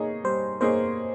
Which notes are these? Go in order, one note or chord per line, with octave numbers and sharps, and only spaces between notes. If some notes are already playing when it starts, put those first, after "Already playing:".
Already playing: A#3 D#4 G#4 C#5
G3 C5
A#3 D#4 G#4 C5 C#5